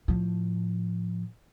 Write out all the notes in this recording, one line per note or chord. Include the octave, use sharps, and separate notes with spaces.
A2 F3